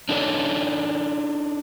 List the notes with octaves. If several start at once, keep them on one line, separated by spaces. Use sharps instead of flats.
D4 D#4 A4 A#4 C#5 D5